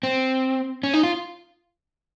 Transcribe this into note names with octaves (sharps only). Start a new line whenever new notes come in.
C4
C#4
D#4
F4